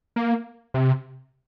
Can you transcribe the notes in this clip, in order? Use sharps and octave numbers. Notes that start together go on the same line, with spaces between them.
A#3
C3